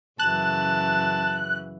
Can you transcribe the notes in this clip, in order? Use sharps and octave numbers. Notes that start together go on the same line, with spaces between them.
F#2 C#3 E3 A5 F#6